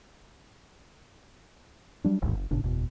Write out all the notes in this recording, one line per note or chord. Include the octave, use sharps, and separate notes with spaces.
F#3 G3 D4
D1 A1 D#2 G#2
F#1
G1 A2 C#3 D4
F#1 E2 B2